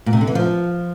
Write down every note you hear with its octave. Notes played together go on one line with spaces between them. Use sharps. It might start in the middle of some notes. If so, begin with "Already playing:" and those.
A#2
C3
D3
E3
F3